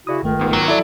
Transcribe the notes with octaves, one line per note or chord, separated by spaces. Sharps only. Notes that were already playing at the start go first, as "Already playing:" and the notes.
C#3 E4 F#4 D5 D#6
G1 C#2 D#3 A3
G#2 B3
F#3
E4 A4 D5 E5